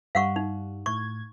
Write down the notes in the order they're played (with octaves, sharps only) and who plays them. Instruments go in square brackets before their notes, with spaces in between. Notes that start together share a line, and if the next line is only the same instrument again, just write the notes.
[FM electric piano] G2 G3 [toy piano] F5 F#5 C#6
[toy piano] D#4
[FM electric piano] A2 G#6 [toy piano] C#6